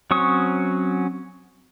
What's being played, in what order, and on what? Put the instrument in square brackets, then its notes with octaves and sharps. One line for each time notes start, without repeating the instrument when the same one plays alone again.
[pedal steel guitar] F#3 C4 C#4 C#6 D#6